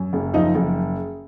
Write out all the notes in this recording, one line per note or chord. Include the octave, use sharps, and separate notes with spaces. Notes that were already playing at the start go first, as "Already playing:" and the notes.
Already playing: F#2
F#1
F3 D#4 D#5
F#1